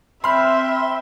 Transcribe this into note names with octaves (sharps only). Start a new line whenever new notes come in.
C4 E5 B5 C6 F6